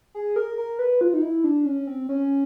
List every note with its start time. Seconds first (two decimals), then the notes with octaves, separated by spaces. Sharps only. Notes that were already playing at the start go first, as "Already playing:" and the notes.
0.15 G#4
0.36 A#4
0.58 A#4
0.79 B4
1.01 F4
1.14 D#4
1.22 E4
1.44 D4
1.66 C#4
1.87 C4
2.09 C#4